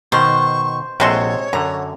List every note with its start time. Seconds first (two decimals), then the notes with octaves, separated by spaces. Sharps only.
0.12 B2 D#3 C5 C#6
1.00 A#1 C3 G#3 F#4 A4 C#5 C6
1.53 F#2 D3 A#5